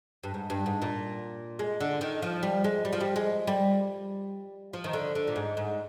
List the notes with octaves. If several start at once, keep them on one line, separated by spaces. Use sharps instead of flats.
G2
G#2
G2
G#2
A#2
G#3
D3
D#3
F3
G3
G#3
G3
F3
G3
G#3
G3
F3
D#3
D3
D3
A#2
G#2
G#2